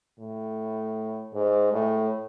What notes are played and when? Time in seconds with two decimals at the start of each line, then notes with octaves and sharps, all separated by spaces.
0.19 A2
1.34 G#2
1.73 A2